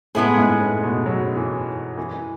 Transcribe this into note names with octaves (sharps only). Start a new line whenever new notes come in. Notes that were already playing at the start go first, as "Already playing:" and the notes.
A2 G#3 B3 E4 G#4
G#2
A2
B2
F#3
E3
E3